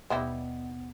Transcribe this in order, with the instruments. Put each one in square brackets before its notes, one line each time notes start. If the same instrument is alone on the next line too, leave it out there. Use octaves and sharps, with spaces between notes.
[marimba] D#2 B2 [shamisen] G3 D#4 E4 [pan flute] B3